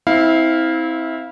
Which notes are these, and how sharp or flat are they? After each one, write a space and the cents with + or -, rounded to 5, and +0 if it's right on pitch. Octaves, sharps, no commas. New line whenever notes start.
C4 +0 E4 -25 F5 +0